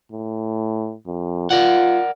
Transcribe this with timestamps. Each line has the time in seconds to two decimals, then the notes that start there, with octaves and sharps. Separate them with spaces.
0.12 A2
1.07 F2
1.51 F4 A#4 D5 F#5